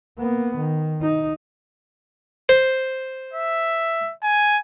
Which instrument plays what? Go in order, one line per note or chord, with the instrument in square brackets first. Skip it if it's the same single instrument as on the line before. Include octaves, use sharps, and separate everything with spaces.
[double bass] A#3 B3
D#3
D#4
[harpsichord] C5
[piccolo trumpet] E5
G#5